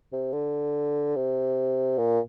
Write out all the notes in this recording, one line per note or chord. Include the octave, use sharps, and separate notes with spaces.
C3
D3
C3
A#2